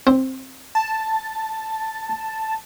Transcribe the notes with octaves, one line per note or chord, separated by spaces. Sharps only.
C4
A5